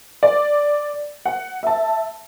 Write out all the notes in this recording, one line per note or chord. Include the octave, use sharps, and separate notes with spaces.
D5
F#5
E5 A5